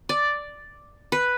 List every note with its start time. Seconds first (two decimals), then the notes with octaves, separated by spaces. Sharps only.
0.09 D5
1.12 B4